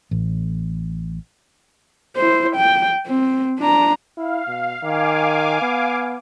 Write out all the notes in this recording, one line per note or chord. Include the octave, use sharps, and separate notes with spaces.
A1
E4 C5
G5
C4
D4 A#5
E4 F5
B2
D#3 F5 G#5 D6
B3